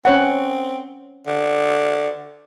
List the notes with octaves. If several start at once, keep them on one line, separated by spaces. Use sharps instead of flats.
C4 C#4 C#5 F#5
D3